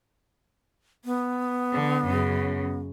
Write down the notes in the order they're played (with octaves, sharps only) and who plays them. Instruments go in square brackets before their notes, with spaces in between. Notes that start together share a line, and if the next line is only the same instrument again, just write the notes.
[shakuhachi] B3
[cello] D3
F#2 C#3